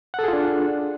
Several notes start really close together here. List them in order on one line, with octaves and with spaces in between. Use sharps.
F#5 A4 G#4 F4 D4